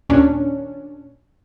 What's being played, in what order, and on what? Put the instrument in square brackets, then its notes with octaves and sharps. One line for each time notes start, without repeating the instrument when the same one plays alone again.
[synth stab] D#2 A#2 C#4 D4